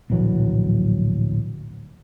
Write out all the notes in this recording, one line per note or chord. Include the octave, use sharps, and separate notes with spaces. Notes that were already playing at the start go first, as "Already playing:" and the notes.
D1 A#1 E3 F#3